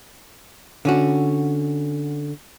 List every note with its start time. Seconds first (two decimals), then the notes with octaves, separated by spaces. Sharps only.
0.85 D3 C#4 F#4